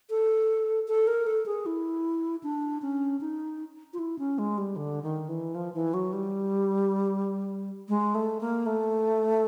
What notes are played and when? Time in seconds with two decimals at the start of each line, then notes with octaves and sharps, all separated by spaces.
0.10 A4
0.88 A4
1.07 A#4
1.27 A4
1.46 G#4
1.66 E4
2.43 D4
2.82 C#4
3.21 D#4
3.93 F4
3.99 E4
4.19 C#4
4.38 G#3
4.58 G3
4.76 D3
5.03 D#3
5.28 E3
5.55 F3
5.74 E3
5.94 F#3
6.13 G3
7.89 G#3
8.15 A3
8.41 A#3
8.66 A3